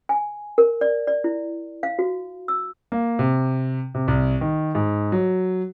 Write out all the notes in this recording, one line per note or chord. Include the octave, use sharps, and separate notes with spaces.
G#5
A#4
D5
D5
E4
F5
F#4
E6
A#3
C3
C3
C2
D#3
G#2
F#3